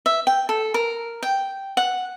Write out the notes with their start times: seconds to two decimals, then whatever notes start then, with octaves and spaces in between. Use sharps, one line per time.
0.06 E5
0.27 G5
0.49 A4
0.74 A#4
1.23 G5
1.77 F#5